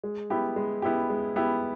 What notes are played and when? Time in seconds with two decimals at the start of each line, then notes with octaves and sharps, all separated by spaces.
0.03 G#3
0.30 B3 E4 G4
0.56 G#3
0.82 B3 E4 G4
1.10 G#3
1.36 B3 E4 G4